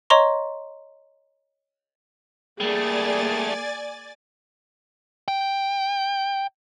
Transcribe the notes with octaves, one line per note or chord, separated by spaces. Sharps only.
C#5 D#5 A#5 C6 C#6
G3 A3 A#3 G#4 D5 G#5 A6
G5